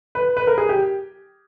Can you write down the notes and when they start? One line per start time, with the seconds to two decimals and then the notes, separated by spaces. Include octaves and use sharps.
0.15 B4
0.37 B4
0.47 A#4
0.58 G#4
0.69 G4